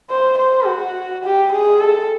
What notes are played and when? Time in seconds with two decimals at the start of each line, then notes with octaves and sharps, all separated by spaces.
0.10 C5
0.38 C5
0.66 F#4
1.24 G4
1.52 G#4
1.80 A4